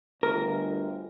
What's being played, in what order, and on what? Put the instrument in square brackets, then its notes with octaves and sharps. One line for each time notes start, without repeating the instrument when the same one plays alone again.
[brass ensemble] G1 D2 [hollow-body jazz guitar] A#4